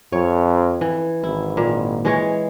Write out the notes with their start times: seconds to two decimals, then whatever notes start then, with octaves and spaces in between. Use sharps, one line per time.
0.12 F2 C#5
0.81 E3
1.23 G#1 E4
1.57 A#2
2.05 E3 G#3 C#5